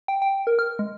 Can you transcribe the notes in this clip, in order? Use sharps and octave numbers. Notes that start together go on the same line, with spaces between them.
G5
G5
A#4
F6
G#3